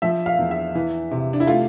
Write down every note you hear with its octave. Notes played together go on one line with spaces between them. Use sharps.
F3 E5
F5
E2
E5
E3
C3
D4
E4
A3 F4